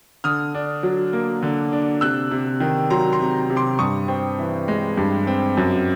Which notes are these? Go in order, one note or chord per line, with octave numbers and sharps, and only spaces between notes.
D3 D#6 F6
D4
F#3
A#3
D3
D4
C3 E6 F#6
C3
D#3
F#3 A#5 C6
A#5 C6
C3
C3
C6 D6
G2 C#6 D#6
C4
E3
G#3
G2
C4
F#2